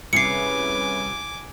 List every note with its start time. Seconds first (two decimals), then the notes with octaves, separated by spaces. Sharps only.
0.13 C2 C#4 G#4 B4 G#5 D6 C7 C#7